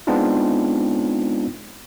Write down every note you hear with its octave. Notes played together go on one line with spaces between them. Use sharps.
G#3 B3 C4 D4 D#4 F4